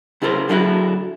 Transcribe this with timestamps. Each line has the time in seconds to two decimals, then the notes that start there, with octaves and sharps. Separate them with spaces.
0.22 C#3 E4 G#4 A#4 C5
0.48 D3 F#3 D#4 E4 F#4 G#4